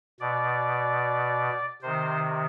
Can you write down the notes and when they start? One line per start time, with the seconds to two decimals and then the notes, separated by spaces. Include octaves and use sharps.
0.20 B2 D5
1.82 C3 D#3 C5